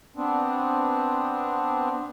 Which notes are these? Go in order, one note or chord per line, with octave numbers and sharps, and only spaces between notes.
B3 C4 D4